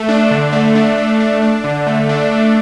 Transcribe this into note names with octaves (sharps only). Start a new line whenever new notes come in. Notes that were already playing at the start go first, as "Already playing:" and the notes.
Already playing: A3
D4
D3
A3
D4
A3
D4
D4
D3
A3
D4
A3